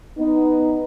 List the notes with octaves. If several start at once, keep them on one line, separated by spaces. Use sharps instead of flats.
B3 D#4